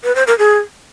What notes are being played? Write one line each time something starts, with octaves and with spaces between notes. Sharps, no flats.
B4
C5
A#4
G#4